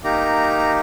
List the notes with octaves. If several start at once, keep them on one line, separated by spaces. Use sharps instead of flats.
A#3 D#4 G4 A#5